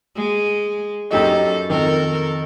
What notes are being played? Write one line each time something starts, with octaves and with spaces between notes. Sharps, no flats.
G#3
F#2 D#4 G4 A4 D#5
F2 D#3 A4 A#4